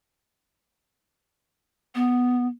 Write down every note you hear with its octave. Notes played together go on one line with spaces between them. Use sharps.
B3